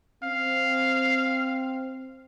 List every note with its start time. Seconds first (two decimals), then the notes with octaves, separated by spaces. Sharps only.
0.24 C4 F5